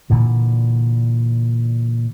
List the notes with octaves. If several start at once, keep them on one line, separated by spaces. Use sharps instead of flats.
A#2 D3 E3